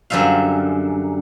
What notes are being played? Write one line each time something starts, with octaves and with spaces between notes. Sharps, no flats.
F#2 D3 G3 E5 F5